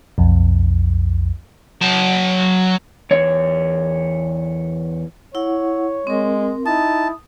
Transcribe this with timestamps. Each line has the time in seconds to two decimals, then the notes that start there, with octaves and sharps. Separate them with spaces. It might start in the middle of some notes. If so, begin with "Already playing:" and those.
0.18 B1 F2
1.81 F#3 A5
3.11 E2 C#5
5.35 E4 C#5 F#5
6.07 G#3 C4 A#4
6.66 D#4 E4 A5 D#6